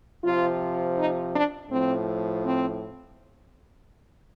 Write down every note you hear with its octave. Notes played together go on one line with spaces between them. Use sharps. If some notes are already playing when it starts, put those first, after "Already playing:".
C3 F3 F4
D#4
D4
A2 F3 C4
C4